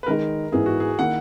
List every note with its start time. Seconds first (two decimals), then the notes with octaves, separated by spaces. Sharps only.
0.03 B4
0.06 D#3 G#3 D#4 A#4
0.52 G#2 E3 B3 E4 G#4
0.66 F#4
0.80 G#4
0.99 D#3 A#3 E4 F#5